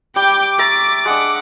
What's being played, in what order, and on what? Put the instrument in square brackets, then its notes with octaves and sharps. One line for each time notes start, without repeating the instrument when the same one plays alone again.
[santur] G3 [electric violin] G5 G6 [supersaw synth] D6
[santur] E5 A#5 C#6 [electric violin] A6
[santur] G#3 D4 [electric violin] F#5